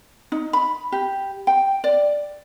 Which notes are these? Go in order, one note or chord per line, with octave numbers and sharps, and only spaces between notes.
D#4
B5
G4
G5
D5